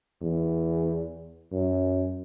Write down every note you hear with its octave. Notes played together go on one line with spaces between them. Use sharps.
E2
F#2